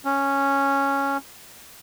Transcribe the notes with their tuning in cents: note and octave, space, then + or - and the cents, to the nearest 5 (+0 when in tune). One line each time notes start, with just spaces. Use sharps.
C#4 -5